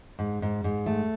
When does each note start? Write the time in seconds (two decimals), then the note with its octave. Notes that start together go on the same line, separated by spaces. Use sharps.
0.19 G#2
0.42 G#2
0.64 G#2
0.86 A3